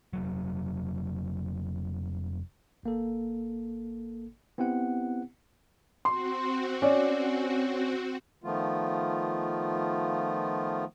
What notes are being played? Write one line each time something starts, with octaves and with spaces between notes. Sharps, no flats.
F1 F#3
G#1 A#3 A4
B3 C4 E4 G4 F#5
C4 F#4 C6
C#4 C#5 D5
D#3 F3 A3 B3 F4